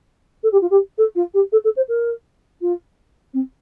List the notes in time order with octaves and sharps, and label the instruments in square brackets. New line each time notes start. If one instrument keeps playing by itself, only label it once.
[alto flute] A4
G4
F4
G4
A4
F4
G4
A4
A4
C5
A#4
F4
C4